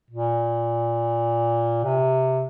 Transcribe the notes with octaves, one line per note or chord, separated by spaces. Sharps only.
A#2
C3